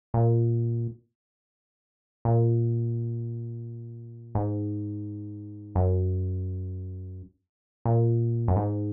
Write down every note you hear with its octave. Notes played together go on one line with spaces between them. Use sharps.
A#2
A#2
G#2
F#2
A#2
F#2
G#2